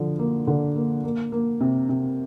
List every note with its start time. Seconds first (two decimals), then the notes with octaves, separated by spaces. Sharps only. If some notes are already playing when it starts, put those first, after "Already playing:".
Already playing: D3 F3
0.19 A#3
0.47 D3
0.76 A#3
1.04 A#3
1.32 A#3
1.60 C3
1.89 C3